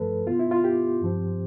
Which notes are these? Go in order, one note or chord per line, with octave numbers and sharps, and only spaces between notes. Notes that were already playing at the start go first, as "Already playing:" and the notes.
Already playing: G2 F3 A3 A4 B4
B2 B3 F4
E4
F4
G4
G2 F3 C4